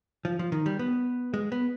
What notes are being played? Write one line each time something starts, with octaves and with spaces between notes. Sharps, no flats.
F3
F3
D#3
G3
B3
G#3
B3